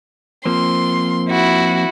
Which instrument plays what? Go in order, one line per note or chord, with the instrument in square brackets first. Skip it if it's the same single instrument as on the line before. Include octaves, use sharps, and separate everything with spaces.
[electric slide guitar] F3 A#3 C4 [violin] C6
[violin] E4 F#4